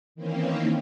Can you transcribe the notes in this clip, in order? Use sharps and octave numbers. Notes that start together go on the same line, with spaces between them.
D#3 E3 A#3 C4 C#4